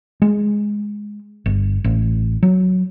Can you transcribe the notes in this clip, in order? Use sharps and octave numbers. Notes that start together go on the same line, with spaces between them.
G#3
G1
A1
F#3